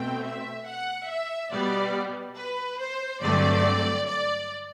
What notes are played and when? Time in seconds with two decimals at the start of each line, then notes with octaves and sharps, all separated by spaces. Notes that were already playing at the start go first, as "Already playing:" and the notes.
Already playing: B2 A3 C4 G5
0.23 E5
0.67 F#5
1.09 E5
1.52 B2 G3 B3 D5
2.37 B4
2.80 C5
3.21 G2 D3 F#3 A3 C4 D5
4.07 D5